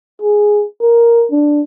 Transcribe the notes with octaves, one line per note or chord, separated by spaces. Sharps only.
G#4
A#4
D4